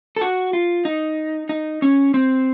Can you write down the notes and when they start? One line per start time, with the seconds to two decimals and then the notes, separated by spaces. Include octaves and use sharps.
0.16 A4
0.21 F#4
0.53 F4
0.85 D#4
1.49 D#4
1.82 C#4
2.14 C4